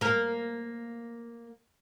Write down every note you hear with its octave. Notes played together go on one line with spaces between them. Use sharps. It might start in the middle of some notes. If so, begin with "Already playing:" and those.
A#3 A#4